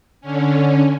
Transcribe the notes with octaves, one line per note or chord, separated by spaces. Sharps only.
D3 C#4